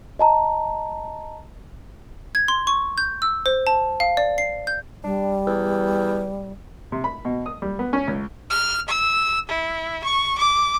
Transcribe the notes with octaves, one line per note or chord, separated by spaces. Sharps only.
D#5 A5 A#5
G#6
C6
C#6
G6
E6
C5
A5
F5
D5
C7
G6
G3 D4
E2
C3
B5
B2
D#6
G3
B3
C#4
C#2
F6
E6
E4
C#6
D6